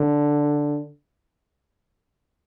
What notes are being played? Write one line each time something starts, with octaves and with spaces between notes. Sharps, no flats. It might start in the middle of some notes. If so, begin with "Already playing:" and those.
Already playing: D3